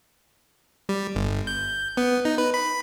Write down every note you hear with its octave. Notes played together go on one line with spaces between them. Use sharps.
G3
G1
G6
B3
D#4
B4
B5